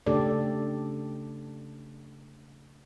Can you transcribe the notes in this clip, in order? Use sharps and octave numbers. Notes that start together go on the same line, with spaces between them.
C#3 A3 D4 G4 A4 D5